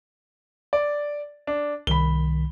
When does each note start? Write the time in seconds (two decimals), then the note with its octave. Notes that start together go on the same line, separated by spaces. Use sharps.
0.73 D5
1.47 D4
1.87 C2 D#3 B5 G7